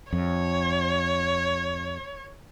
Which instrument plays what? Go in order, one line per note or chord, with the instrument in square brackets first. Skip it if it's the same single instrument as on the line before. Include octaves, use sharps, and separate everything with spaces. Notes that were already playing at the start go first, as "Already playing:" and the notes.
[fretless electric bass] F2 [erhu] C#5